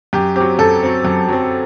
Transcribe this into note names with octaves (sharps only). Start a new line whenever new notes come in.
F#2 G4
F#3 C4 G4
F#2 A4
F#3 C4
F#2
F#3 C4